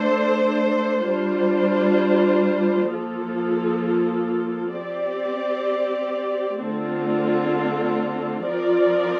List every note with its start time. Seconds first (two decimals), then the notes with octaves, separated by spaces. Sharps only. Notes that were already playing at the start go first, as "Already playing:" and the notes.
Already playing: A3 D4 A4 C5
1.07 G3 D4 F4 C5
2.92 F3 A#3 F4 A4
4.77 C4 G4 D5
6.62 D3 A3 C4 F4 A4
8.47 F3 C4 F4 A#4 D5